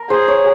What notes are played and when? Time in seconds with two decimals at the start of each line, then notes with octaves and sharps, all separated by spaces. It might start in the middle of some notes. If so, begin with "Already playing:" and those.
Already playing: A#4
0.10 G#4 C5
0.28 C#5